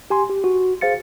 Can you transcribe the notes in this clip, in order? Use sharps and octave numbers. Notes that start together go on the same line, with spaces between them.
G4 G#5 C6
G4
F#4
G#4 C5 F5 A6 C#7